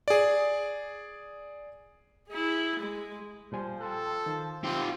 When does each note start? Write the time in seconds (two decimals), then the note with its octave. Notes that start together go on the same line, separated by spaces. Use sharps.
0.08 G#4 D5
2.29 E4 G#4
2.80 G#3
3.52 A#2 F3 G3 C5 G#5
3.81 A4 G5 C6 F#6
4.26 D#3
4.64 C4 F4 G4